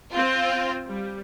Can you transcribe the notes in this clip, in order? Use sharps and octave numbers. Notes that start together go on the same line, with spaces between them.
C4 F4
G3